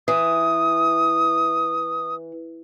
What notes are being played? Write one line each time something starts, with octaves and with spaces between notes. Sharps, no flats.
E3 D#6